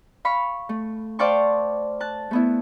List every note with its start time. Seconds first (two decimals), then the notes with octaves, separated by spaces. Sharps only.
0.25 F5 B5 C#6 F6
0.69 A3
1.19 C5 D5 F5 G5 A5 C#6
2.00 A5 F#6
2.31 A3 B3 E4